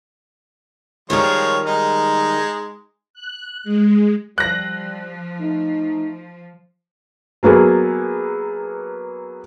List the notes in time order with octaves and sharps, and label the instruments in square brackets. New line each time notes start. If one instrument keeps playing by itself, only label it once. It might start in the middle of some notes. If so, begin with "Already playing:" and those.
[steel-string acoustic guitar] D#3 G3 A#4 [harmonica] F3 G#3 C#5
[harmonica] G#3 D#4
[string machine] F#6
G#3
[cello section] F3 [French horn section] G3 [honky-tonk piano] F#6 A#6
[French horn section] A3 D#4
[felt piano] F#3 A#3 B3 G#4 A4